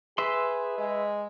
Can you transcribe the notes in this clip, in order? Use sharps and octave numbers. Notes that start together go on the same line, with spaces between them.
G#4 B4 E5 C6
G#3